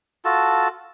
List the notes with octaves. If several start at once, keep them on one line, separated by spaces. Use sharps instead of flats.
F4 F#4 A4 A5